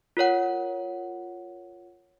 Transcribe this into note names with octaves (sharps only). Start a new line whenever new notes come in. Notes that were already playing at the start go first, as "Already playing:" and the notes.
F4 A#4 C#5 F#5